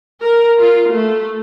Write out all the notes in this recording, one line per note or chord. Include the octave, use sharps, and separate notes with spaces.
A#4
F4
A3